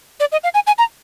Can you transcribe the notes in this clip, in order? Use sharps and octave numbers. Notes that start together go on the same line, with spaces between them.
D5
D#5
F5
G#5
G#5
A#5